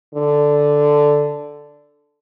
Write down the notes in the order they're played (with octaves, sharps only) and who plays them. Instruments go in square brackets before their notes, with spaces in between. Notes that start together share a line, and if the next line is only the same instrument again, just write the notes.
[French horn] D3